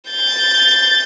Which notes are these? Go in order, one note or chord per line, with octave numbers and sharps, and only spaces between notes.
G6 A6